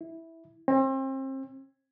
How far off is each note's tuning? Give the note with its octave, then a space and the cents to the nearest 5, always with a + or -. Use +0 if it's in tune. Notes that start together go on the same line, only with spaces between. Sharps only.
E4 -10
C4 +35